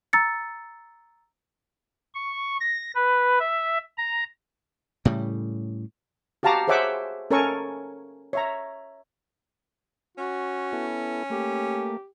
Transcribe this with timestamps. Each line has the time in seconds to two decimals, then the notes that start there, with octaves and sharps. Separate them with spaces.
0.13 A#5 E6 A6 C#7
2.14 C#6
2.60 A#6
2.95 B4
3.40 E5
3.98 A#5
5.05 A2 C#3 G3
6.43 F#4 G4 F5 A5 A#5 D6
6.68 G#4 C5 C#5 E5 F#5 D6
7.31 C#4 A4 A#4 C#5 G#5 C#6
8.33 C#5 E5 A#5
10.18 C#4 F#4
10.73 B3 E4 A4
11.30 A3 A#3 G4